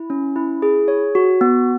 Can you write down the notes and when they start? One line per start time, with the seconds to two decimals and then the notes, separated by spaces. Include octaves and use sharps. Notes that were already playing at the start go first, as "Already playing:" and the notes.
Already playing: E4
0.10 C#4
0.36 E4
0.62 G#4
0.88 C#5
1.15 F#4
1.41 B3